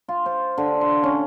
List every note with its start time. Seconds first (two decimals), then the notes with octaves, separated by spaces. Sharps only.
0.08 F4
0.26 C5
0.58 D3
0.81 C6
1.03 C#4